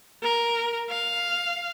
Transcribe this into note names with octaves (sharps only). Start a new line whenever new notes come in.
A#4
F5